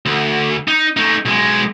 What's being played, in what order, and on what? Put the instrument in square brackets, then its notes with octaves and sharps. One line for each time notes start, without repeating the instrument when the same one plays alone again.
[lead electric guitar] D2
D#4
A3 D#4
B1 G#3